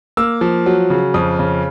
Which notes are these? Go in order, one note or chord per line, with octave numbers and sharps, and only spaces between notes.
A#3 E6
F3
F#3
C#3
F2 D#6
C#3